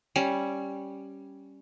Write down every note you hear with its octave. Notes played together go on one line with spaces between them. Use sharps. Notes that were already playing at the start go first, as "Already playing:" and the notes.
G3 C#4